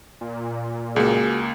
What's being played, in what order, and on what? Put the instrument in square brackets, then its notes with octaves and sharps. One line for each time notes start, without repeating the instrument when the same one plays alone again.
[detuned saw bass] A#2
[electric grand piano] C#2 A#3 [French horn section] F#4 G#4